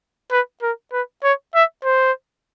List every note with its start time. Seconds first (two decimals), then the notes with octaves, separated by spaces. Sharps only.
0.31 B4
0.62 A#4
0.92 B4
1.24 C#5
1.55 E5
1.84 C5